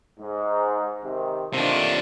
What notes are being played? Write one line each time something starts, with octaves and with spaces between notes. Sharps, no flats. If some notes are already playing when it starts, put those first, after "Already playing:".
G#2
C3 D#3
C3 D#3 F3 A3 D4